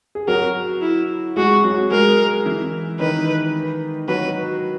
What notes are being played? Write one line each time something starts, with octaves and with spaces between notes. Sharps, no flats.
G#4
F#3 F#4 A#4
E4
G#3 F#4 G#4
F#3 F#4
G#3 G#4 A#4
E3 E4
D#3 D#4 B4
F#3 F#4 B4